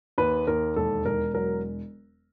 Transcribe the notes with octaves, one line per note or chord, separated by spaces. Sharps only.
D#2 B4
D#2 A#4
E1 A4
E1 A#4
F#3 A#4